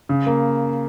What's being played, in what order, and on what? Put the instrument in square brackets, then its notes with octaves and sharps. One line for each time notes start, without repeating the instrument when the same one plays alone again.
[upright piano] C#3
A#3